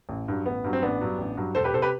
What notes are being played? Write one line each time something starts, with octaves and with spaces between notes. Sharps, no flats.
A1
G2 F#3
A1 B3
G2 F#3
C4
A1 B3 D4
G2 F#3
A1
G2 F#3
E1 A4 C5
G4 B4
C3 A4 C5
G4 B4